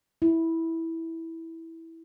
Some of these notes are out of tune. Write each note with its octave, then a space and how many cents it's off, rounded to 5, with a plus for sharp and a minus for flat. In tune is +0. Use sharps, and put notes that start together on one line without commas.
E4 -10